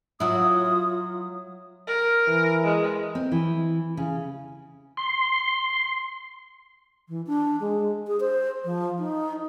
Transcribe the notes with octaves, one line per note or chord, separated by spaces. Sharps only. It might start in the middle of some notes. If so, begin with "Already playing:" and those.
F#3 E4 F4 D#6
A#4
E3
G#3
C4
E3
C#3
C6
E3
D4
G#3
G#4
C5
F3
D#4